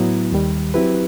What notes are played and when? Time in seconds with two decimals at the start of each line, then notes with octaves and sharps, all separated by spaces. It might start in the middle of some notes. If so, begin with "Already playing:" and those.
Already playing: A2 F#3 B3 E4
0.32 D#2 D#3 G3
0.74 F#3 C4 E4 G4 B4